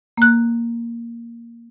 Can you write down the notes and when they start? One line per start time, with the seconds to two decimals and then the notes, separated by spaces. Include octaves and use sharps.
0.17 A#3 F#6